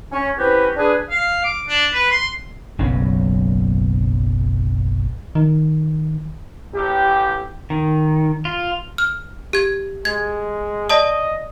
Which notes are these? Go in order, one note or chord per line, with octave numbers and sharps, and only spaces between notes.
C#4
C4 C#4 E4 F#4 G4 B4
D4 G#4 B4
F5
D6
D4
B4
C6
F#1 B1 F#3 C#4
D#3
A1 G4
D#3
F4
F6
G4 G#6
G#3 G#6
D5 D#5 A5 D#6